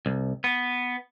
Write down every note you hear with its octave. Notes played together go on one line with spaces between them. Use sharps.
C2
B3